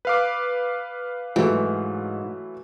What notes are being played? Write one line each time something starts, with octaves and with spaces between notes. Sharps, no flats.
B4 F5 D6
G#2 E3 F#3 A3